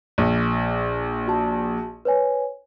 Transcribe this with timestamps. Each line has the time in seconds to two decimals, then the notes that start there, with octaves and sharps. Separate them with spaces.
0.18 A#1
1.27 F#4 A5
2.05 B4 C#5 G#5